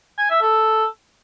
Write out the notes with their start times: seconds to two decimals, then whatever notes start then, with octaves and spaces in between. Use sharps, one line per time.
0.19 G#5
0.30 E5
0.42 A4